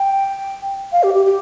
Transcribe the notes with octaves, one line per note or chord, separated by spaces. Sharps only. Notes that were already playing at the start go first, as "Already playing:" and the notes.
Already playing: G5
F5
G4
G4
G4